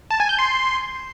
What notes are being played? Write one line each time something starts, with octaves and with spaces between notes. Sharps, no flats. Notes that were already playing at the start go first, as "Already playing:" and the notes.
A5
G#5
G6
C6